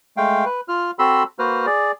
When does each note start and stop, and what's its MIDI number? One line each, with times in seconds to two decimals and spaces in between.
0.17 0.45 56
0.17 0.45 57
0.17 0.45 77
0.17 0.45 79
0.45 0.61 71
0.68 0.91 65
0.68 0.91 89
0.99 1.23 60
0.99 1.23 66
0.99 1.23 69
0.99 1.23 83
0.99 1.23 84
0.99 1.23 88
1.39 1.66 58
1.39 1.66 66
1.39 1.66 71
1.39 1.66 72
1.39 1.66 89
1.66 1.92 68
1.66 1.92 74